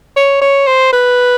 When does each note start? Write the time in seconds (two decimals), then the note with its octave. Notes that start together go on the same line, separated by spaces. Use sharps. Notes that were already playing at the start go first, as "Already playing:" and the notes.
0.16 C#5
0.41 C#5
0.67 C5
0.92 B4